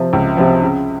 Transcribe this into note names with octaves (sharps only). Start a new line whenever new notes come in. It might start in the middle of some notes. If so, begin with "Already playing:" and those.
Already playing: C3 F3
C#2
C3 F3
C#3